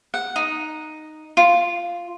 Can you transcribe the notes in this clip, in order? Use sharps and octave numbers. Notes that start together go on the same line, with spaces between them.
F#5
D#4
F4